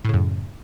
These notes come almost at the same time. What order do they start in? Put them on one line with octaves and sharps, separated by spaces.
A2 C#3 F#2